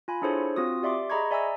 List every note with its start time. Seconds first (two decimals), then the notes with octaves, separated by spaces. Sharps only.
0.08 F4 G#5 B5
0.22 D4 E4 G#4 A4 C5 C#5
0.56 C4 F4 F#4 D#6
0.83 G4 D5 E5 C6 D6
1.10 G#4 D#5 A#5 B5 C#6 G#6
1.31 D5 E5 G#5 A#5 E6